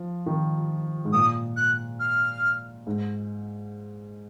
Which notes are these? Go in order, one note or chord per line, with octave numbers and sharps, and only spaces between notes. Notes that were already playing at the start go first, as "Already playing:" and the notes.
Already playing: F3
D#3
G#2
A#2 D#6
F#6
F6
G#2